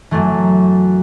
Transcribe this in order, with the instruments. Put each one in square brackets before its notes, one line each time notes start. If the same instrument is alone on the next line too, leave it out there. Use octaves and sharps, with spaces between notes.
[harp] F#2 E3 A3